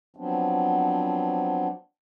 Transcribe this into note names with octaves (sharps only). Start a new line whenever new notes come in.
F3 F#3 B3 C4 D4